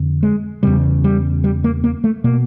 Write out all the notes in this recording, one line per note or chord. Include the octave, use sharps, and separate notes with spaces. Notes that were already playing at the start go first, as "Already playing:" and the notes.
Already playing: F2 D3
G#3
E2 C#3 G3
G3
G3
A#3
A#3
A3
B2 A#3